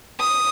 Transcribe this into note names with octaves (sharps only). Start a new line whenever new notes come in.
D#6